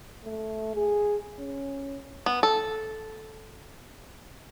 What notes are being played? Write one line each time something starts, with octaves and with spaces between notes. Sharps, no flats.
A3
G#4
C#4
B3
A4